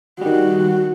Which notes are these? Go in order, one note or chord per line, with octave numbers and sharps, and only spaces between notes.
D#3 G3 F#4